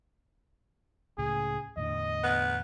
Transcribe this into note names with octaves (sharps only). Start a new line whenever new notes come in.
C#2 A2 C#3 G#4
E2 A2 D3 D#5
B3